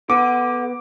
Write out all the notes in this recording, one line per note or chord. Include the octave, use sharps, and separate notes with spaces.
B3 A4 F#5 D6